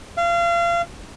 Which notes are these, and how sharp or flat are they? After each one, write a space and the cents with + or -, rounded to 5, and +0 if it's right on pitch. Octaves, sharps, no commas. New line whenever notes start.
F5 -30